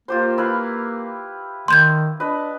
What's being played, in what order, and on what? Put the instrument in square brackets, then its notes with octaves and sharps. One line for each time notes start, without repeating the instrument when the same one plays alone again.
[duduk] A#3 [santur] F4 G4 C5
[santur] E4 B4 F5
[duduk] D#3 [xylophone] C6 G6 G#6
[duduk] D4 [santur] B4 D#5